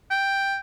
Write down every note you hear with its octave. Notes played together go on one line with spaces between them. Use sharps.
G5